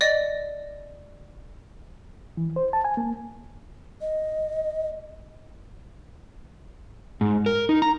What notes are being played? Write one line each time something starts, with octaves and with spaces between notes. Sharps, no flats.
D5 D#5
E3
C5
A5
G#5
A#3
D#5
G#2
A#4
D#4
A#5